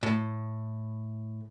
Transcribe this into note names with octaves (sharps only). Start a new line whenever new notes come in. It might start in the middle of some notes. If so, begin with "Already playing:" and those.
A2